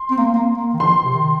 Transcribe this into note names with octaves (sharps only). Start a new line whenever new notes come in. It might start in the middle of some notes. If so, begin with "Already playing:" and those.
Already playing: C6
C4
A#3
C4
A#3
A#3
D#3
F3 C6
C3
D#3